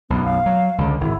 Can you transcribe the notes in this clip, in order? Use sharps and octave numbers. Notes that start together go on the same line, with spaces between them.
B1 F#2 B3
F5
F#3
C#2 D3
G#1 E4